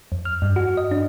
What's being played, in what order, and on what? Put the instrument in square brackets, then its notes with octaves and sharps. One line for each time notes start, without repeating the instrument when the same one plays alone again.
[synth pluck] F2
F6
G2
F#4
D#5
D4